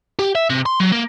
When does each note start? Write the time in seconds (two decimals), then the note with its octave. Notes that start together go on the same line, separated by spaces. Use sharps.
0.19 G4
0.35 E5
0.50 C3
0.66 C6
0.80 F#3
0.92 A#3